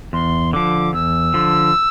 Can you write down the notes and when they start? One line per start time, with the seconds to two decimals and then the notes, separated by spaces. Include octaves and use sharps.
0.13 E2 C6
0.53 D3 F3 D6
0.93 E2 E6
1.34 D3 F3